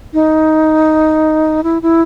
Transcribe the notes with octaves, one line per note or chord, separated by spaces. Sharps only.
D#4
E4
E4